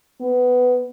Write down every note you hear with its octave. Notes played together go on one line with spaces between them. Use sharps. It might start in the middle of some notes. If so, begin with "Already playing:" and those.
B3